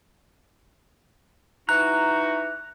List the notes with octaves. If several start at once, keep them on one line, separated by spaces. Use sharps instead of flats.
E3 D#4 F#4 A#5 F#6